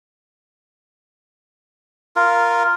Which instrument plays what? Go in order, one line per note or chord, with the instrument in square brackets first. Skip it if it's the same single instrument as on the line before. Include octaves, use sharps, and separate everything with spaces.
[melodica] F4 A#4